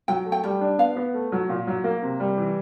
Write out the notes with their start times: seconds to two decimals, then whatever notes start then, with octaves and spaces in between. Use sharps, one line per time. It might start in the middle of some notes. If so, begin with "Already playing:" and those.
0.08 F#3 G5
0.26 A3
0.32 G5
0.43 G3 G5
0.61 D4
0.78 B3 F5
0.97 B3
1.14 A3
1.32 F#3
1.49 A#2
1.67 F#3
1.84 A#3
2.02 C3
2.20 G3
2.37 E3